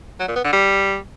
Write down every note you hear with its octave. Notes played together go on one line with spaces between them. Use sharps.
F#3
A#2
B3
D3
G3